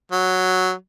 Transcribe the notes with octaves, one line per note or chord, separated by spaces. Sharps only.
F#3